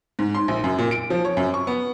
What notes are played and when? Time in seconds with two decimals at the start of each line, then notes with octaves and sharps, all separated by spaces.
0.19 G#2
0.35 C6
0.48 A#1
0.64 F#2
0.78 A#2
0.91 D7
1.10 F3
1.25 C#5
1.37 F#2
1.54 C#6
1.67 B3